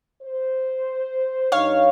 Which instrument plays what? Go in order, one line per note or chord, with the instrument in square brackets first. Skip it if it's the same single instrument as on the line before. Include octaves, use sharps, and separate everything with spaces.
[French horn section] C5
[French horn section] G2 D#4 [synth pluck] C#5 F5